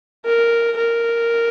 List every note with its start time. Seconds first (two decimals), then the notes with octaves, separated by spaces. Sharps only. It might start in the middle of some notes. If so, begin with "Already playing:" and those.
0.26 A#4
0.77 A#4